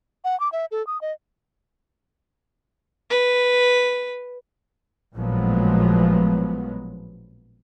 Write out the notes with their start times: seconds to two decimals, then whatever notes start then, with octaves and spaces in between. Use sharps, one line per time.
0.24 F#5
0.40 D6
0.52 E5
0.71 A4
0.87 D#6
1.01 D#5
3.11 B4
5.15 A1 A#2 F3 F#3 G#3 B3